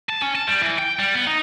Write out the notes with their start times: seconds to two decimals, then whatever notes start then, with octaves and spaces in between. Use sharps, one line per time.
0.09 A5
0.22 C#4
0.36 A5
0.47 G3
0.63 E3
0.79 G5
0.99 G3
1.14 B3
1.27 D#4